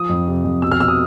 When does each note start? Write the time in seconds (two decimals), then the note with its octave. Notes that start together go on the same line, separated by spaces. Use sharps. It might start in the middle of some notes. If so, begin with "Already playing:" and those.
Already playing: F3 D#6
0.09 F2
0.28 C3
0.44 F2
0.62 B2 E6
0.71 F6
0.80 B2 E6
0.88 D#6